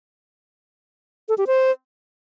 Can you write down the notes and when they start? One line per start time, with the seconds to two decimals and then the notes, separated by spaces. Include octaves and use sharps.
1.29 A4
1.38 G4
1.47 C5